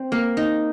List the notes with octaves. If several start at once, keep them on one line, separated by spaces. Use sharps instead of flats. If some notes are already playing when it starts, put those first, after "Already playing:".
Already playing: C4
A#3
D#4